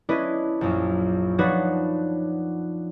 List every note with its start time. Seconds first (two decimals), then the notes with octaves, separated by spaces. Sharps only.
0.09 C#4 D4 E4 B4 D#5
0.61 A#1 F#2
1.38 F3 D4 D#4 F#4 B4 C#5